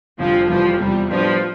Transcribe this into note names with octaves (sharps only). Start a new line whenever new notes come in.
F1 F2 D3 F3 G3
F1 F2 E3 F3 G3
E2 C3 F3 G3
A2 F3 G3 B3 D4 F4